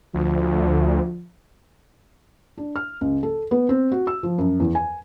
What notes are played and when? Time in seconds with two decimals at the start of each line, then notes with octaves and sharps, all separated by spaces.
0.14 D2 F3
2.58 D4
2.76 F6
3.01 C#2
3.23 A4
3.51 B3
3.69 C4
3.92 F#4
4.07 E6
4.23 F3
4.38 F#2
4.60 E2
4.75 G#5